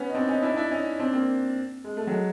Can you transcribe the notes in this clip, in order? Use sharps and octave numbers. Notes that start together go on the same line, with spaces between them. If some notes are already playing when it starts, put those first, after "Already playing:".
Already playing: B3 C#4
D#4
C4 D4
C#4 D#4
D4 E4
D#4
D4 E4
C#4 D#4
C4 D4
A#3 C4
G#3
A3
F#3 G#3